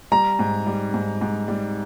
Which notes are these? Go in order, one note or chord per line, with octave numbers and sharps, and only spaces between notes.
G3 A#5
G#2
G3
G#2
G#2
G3